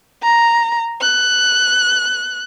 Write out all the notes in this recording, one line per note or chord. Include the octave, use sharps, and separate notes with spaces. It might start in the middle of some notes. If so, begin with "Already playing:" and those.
A#5
F#6